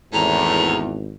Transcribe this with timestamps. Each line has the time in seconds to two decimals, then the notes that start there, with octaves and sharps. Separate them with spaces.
0.13 G#1 E2 A2 A#5